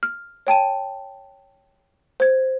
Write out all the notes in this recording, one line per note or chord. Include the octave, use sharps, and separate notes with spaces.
F6
C#5 G5 A5 D#7
C5 G#6